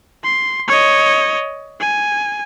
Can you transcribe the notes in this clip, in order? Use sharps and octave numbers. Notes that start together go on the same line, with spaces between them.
C6
C#5 D#5
G#5